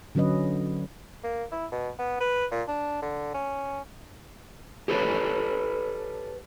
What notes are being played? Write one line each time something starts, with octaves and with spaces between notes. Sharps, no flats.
D3 F#3 C#4 B4 D#5
A#3
E4
B2
B3
B4
A#2
D4
D3
C#4
G4 A4 B4 C#5